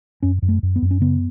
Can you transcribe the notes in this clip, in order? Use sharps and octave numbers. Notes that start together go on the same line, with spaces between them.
F#2 C#4
F#2
A3
F#2
B3
F#2
C#4
C#3 B3